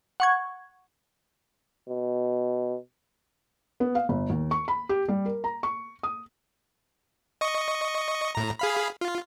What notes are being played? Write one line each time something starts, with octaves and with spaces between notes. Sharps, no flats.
F#5 C#6 G#6
B2
B3
F5
G1
D#2
C#6
B5
G4
G3
A#4
A#5
C#6
D#6
D#5 C#6
A2 A#5
G#4 F5 B5
F4